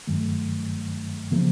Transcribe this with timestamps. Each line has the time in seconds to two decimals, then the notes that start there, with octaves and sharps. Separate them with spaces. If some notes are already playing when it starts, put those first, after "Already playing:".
0.07 G2 D#3 F#3 A3
1.31 C#3 F3 A#3